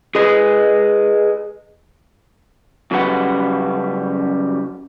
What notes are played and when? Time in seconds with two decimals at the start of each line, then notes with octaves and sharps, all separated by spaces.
0.15 G#4 B4 D#5
2.91 F#2 C#3 G3 B4 F#5